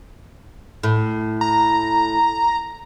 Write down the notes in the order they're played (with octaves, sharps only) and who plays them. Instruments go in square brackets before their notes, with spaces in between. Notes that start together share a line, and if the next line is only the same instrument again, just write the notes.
[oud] A2
[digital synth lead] A#5